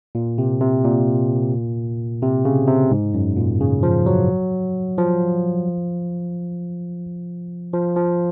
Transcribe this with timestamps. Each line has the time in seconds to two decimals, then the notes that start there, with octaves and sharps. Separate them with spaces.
0.15 A#2
0.38 C3
0.61 C3
0.84 A#2
2.22 C3
2.45 C#3
2.68 C3
2.91 G#2
3.14 F#2
3.37 A#2
3.60 C#3
3.83 F3
4.06 F#3
4.98 F3
7.73 F3
7.96 F3